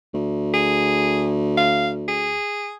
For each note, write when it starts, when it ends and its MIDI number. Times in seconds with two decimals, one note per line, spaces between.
0.14 2.38 38
0.54 1.30 68
1.58 1.89 77
2.08 2.76 68